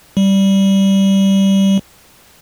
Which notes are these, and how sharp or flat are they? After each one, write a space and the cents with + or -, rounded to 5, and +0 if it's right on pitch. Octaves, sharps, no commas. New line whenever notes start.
G3 -10